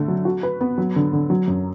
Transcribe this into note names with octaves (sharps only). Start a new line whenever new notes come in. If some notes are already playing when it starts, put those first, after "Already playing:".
Already playing: D3 A3
F#3
F#4
B4
B3
F#3
D3
D3
F#3
F#2